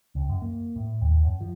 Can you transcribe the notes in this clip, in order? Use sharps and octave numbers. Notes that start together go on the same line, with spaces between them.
C#2
F#2
A#3
A2
D#2
F#2
F3